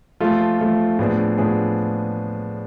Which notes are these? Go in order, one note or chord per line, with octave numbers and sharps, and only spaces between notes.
F3 A3 F4
F3 A3 F4
A2 F3 B3 D4 G#4
A2 F3 B3 D4 G#4